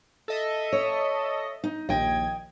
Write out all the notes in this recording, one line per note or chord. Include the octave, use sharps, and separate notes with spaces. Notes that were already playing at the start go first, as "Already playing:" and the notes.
A4 D#5 E5
C#5
D#4
A#1 D#2 D#5 G5 G#6